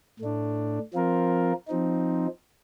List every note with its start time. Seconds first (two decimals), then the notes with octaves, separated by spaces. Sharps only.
0.20 A2 A3 D4
0.94 F3 C4 F4 A#4
1.68 F3 C4 D#4